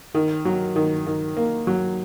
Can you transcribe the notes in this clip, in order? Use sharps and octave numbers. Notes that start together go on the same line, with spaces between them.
D#3
F#3
D#3
D#3
A#3
F#3